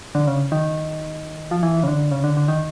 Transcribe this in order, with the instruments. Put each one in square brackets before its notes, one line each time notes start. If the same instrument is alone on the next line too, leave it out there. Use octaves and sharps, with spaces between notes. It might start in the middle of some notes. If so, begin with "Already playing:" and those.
[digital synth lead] D3
C#3
D#3
F3
E3
C#3
D3
C#3
D3
D3
D#3